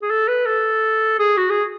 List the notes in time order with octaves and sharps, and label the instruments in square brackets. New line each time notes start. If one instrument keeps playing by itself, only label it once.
[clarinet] G#4
A4
B4
A4
G#4
F#4
G#4